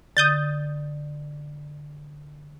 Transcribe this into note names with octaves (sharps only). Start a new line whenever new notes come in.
D3 D#6 G6 A6